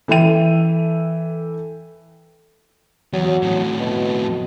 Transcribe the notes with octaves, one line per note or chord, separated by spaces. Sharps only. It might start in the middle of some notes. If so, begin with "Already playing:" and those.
E3 A4 E5 G5 D#7
E2 F#3
F2 A2
B2